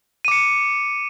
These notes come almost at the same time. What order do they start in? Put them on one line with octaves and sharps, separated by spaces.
D#7 D6 C#7